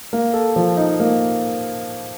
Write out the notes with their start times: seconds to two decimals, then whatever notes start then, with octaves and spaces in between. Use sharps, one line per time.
0.13 A#3
0.33 A4
0.56 F3
0.77 D#4
1.00 A#3